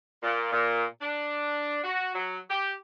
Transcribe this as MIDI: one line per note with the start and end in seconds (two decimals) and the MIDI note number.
0.23 0.51 46
0.51 0.83 46
1.01 1.80 62
1.84 2.13 66
2.15 2.38 54
2.49 2.72 67